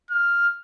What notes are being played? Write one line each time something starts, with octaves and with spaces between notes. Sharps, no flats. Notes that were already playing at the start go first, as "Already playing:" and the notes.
F6